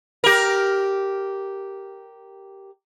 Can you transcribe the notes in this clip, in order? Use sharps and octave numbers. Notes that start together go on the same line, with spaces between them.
G4 A#4